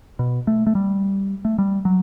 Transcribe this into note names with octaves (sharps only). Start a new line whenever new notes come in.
B2
A3
A3
G3
A3
G3
F#3